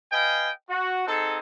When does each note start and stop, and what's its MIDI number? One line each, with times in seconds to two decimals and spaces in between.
0.11 0.49 71
0.11 0.49 75
0.11 0.49 77
0.11 0.49 79
0.11 0.49 80
0.69 1.06 66
1.07 1.38 60
1.07 1.38 63
1.07 1.38 68
1.07 1.38 69